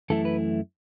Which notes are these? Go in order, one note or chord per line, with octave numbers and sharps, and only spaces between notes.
F#2 E3 A3 E4 A4
B4